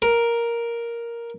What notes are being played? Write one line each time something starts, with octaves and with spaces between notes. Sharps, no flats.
A#4